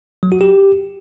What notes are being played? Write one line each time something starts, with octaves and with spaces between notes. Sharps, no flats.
F#3
F#4
G4